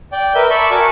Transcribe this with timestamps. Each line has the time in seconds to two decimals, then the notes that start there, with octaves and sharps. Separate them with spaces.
0.12 D5 G5
0.35 A#4 B4 E5 G6
0.50 D5 E5 A5 B5 C#6
0.71 F#4 A#4 G#5 A5 C#6